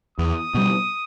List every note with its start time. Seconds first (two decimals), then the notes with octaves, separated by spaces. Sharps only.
0.18 E2 D#6
0.54 B2 G3